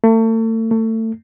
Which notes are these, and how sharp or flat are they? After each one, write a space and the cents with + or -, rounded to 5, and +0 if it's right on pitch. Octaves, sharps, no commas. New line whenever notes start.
A3 +35
A3 +25